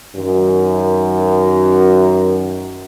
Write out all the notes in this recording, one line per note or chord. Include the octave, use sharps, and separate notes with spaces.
F#2 D#3